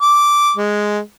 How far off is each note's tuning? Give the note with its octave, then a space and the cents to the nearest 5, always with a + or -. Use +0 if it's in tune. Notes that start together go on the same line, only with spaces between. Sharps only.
D6 -5
G#3 +0